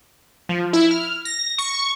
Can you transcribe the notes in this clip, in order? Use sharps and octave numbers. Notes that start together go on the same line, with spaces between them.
F3
E4
F6
A#6
C#6